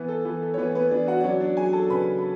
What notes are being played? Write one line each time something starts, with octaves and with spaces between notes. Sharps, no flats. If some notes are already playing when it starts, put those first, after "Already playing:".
Already playing: E3 B3 B4
A4
E3 A4
A4
C#5
E3 B3 B4
B3 B4
E3 D4 D5
F#4 F#5
D5
F#3 C#4 C#5
D4 D5
F#3 G#4 G#5
A4 A5
C#3 B4 B5
B5